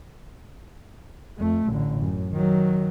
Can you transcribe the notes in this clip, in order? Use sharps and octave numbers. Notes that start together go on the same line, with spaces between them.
F2 A3
A1 D3
F#2
D#3 F#3